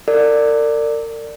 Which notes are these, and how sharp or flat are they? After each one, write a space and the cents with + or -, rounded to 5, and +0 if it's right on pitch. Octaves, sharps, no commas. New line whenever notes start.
A#4 -40 D5 +5